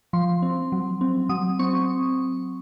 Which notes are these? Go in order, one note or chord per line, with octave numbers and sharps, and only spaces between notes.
F3 C6
C4
F#3
C4
F#3 D#6
C4 C#6